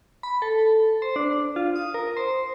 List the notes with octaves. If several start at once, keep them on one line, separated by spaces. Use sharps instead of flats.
B5
A4
C5
D4
F4
D#6
A#4
C5